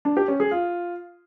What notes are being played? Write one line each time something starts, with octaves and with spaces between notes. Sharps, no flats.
D4
G4
C#4
G#4
F4